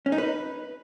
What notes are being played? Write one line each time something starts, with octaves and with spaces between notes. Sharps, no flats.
C#4
D#4
B4